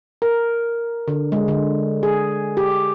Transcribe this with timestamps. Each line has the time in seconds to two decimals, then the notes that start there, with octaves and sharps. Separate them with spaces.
0.22 A#4
1.08 D3
1.32 G#3
1.48 D3
2.03 G#4
2.57 G4